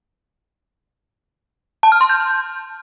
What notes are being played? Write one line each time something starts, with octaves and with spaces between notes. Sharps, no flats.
A5
F6
C6
G6